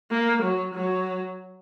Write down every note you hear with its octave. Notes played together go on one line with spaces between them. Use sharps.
A#3
F#3
F#3